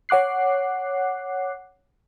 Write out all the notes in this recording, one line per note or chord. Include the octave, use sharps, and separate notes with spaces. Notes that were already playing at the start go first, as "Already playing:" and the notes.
C#5 F#5 D6 F#6 C7